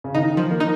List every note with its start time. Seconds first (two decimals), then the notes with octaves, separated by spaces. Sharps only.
0.04 C#3
0.15 D#3 D#4
0.37 F3
0.51 A#3
0.60 D#4